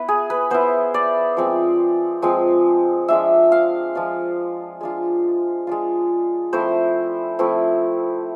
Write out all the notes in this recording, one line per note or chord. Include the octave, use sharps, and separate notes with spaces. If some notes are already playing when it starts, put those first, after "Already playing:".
Already playing: B3 E4 B4
G#4
B4
B3 E4 C5
D5
F3 G#3 C4
F3 G#3 C4
F3 G#3 D4 F4 E5
F5
F3 G#3 D4 F4
G#3 D4 F4
G#3 D4 F4
F3 A3 C4 E4 C5
F3 A3 C4 E4